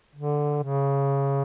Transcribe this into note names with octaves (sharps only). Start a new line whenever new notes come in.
D3
C#3